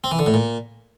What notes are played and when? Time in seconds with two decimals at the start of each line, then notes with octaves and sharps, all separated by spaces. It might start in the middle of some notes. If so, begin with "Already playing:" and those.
0.04 C4
0.11 E3
0.19 D3
0.26 A2
0.34 A#2